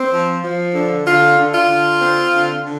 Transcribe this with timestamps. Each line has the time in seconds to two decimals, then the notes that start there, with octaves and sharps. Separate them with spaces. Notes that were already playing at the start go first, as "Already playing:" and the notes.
Already playing: C4
0.12 F3
0.44 F3
0.74 D3
1.06 D3 F4
1.38 D3
1.53 F4
1.69 D3
2.01 C4
2.32 D3
2.64 D3